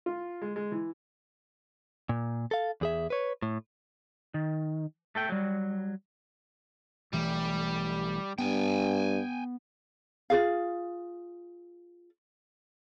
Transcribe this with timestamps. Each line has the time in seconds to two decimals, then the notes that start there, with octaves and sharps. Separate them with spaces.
0.06 F4
0.42 G#3
0.56 G#3
0.72 E3
2.09 A#2
2.51 A4 F5
2.81 E2 G#4 E5
3.10 B4 C#5
3.42 A2
4.34 D#3
5.15 A3 A4 G5
5.29 F#3 G3
7.13 B1 E3 G3 A3
8.38 G2 B3 G5 G#5
10.30 F4 F#4 G#4 F5